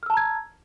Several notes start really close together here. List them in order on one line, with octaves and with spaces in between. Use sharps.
F6 E6 A5 A#5 G#6